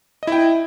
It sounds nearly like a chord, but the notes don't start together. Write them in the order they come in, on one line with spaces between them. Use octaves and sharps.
D#5 E4 G5